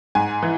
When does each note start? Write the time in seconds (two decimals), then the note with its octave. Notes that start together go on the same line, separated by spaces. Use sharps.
0.15 G#2 G#5
0.42 E3